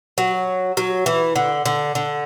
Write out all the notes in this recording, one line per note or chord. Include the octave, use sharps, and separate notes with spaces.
F#3
F#3
E3
D3
D3
D3